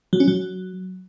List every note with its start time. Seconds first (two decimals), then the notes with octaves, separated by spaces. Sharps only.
0.13 F#3
0.20 C#4
0.28 F#3